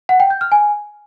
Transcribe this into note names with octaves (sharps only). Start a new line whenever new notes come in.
F#5
G5
G6
F6
G#5